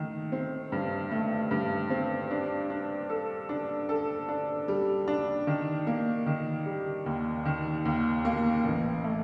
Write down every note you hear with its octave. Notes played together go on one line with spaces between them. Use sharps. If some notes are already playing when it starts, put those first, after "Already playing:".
Already playing: D#3 A3
C4
G2
A3
G2
C4
D4
D4
A4
D4
A4
D4
G3
D4
D#3
A#3
D#3
G3
D#2
D#3
D#2
A#3
A1
A3